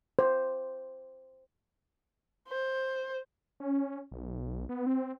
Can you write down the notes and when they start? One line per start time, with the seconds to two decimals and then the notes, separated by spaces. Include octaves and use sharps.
0.19 C5
2.48 C5
3.60 C#4
4.12 B1
4.69 B3
4.86 C4